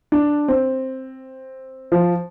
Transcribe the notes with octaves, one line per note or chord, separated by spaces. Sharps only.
D4
C4
F3